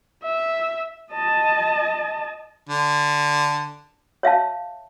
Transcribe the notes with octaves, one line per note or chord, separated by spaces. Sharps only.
E5
D#5 A5
D3
C#5 E5 F5 A5